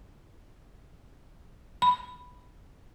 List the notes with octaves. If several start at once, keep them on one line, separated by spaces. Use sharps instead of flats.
B5